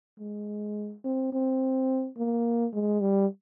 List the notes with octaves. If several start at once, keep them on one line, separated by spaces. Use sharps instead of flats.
G#3
C4
C4
A#3
G#3
G3